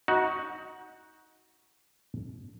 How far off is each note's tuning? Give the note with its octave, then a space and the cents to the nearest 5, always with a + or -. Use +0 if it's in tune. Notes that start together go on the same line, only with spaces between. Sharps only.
D#4 +20 F#4 +0